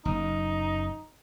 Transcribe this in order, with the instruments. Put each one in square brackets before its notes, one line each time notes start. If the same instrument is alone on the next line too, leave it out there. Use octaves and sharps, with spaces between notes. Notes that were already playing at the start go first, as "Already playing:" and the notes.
[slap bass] F#1 [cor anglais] D#4